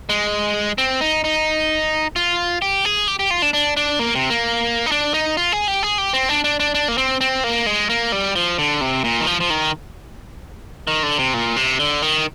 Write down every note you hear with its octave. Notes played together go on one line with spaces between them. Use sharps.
G#3
C4
D#4
D#4
F4
G4
G#4
G4
G4
F4
D4
D4
D4
A#3
C3
A#3
D#4
D4
D#4
F4
G#4
G4
G#4
G4
C4
D4
D4
D4
D4
A#3
C4
C4
A#3
G#3
A#3
G3
F3
D3
C3
A#2
D#3
F3
F3
D#3
D#3
D3
C3
A#2
C3
D3
D#3